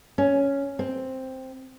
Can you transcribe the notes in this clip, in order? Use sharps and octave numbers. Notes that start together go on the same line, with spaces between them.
C#4
C4